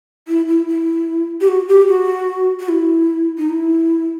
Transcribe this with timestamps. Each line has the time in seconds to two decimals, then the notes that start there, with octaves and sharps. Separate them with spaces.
0.28 E4
0.48 E4
0.68 E4
1.41 G4
1.48 F#4
1.68 G4
1.88 F#4
2.60 F#4
2.69 E4
3.38 D#4
3.49 E4